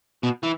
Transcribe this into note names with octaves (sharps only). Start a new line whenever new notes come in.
B2
E3